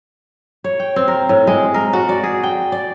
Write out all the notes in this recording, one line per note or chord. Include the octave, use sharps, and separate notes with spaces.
C#5
G5
C4
A#4
A2
G#3
A#4
F#4
D5
G#4
G5
D5